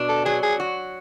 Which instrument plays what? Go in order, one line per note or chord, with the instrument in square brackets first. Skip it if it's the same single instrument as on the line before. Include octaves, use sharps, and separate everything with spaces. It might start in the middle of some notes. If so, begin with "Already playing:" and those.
Already playing: [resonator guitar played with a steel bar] B2 D4
[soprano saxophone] A4
[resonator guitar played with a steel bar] F#3 [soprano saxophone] G#4
[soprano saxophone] G#4
[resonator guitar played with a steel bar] F#4